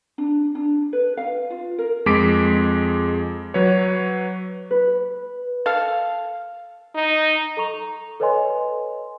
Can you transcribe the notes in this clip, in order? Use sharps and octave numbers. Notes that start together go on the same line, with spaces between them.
D4
D4
B4
F5
F4
A#4
F2 G#3 D6 B6 D7
F#3 B4 C#5
B4
A4 F5
D#4
A4 A#5 C#6 F7
A4 B4 C#5 D#5 G#5 C6